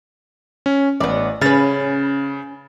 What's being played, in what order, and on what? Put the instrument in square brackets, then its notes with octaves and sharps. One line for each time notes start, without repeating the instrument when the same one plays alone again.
[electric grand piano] C#4
[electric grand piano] A1 [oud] B3 D5
[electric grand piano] C#3 A6 [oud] C#4 B4